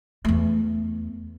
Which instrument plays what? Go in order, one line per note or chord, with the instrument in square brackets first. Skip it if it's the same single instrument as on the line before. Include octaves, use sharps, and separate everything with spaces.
[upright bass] E2 A3